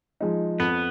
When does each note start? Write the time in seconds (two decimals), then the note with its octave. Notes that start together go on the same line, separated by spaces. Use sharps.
0.21 F3 G#3 D#4
0.60 F2 B3